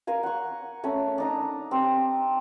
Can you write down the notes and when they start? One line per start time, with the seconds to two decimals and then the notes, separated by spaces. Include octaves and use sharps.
0.07 A#4 F5 G#5
0.23 F#5 C#6
0.83 A3 C#4
1.18 D4 D#4 A#5
1.71 C4 G4